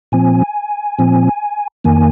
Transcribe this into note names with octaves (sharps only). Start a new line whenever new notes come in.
A#2 F3 C4 G#5
A#2 F3 C4
F2 D#3 A#3 G#5